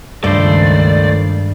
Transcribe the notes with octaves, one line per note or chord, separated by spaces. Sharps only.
C#2 G2 D#3 A3 C5 D5